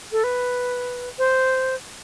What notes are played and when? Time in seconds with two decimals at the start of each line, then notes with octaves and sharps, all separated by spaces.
0.12 A4
0.24 B4
1.18 C5